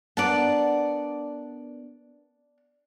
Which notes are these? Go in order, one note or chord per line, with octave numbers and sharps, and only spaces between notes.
B3 D4 A#4 D5 F#5 A5